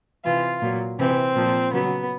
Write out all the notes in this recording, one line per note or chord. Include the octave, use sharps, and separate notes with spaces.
C3 E3 F4
A#2 F#3
C3 E3 C4
A#2 F3
C#3 F#3 B3